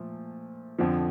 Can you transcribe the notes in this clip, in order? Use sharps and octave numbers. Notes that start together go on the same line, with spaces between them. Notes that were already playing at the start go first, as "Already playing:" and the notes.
Already playing: A#2 F3 A3
F2 D3 F3